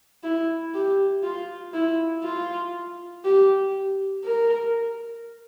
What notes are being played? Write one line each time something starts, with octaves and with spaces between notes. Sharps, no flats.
E4
G4
F4
E4
F4
G4
A#4